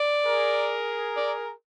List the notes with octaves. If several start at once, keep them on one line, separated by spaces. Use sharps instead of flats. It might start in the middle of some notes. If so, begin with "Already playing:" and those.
Already playing: D5
G#4 A#4
D5